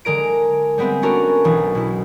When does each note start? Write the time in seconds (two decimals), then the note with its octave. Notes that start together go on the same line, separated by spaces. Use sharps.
0.05 D3 G#3 A#4 D7
0.78 G3 G#3 B3 C4 E5
1.02 B3 C#4 D4 F#4 A4 A#4
1.44 B1 E3
1.75 B2 E4